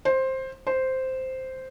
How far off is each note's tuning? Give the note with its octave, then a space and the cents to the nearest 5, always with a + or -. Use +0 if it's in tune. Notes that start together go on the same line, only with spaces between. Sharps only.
C5 +10
C5 -5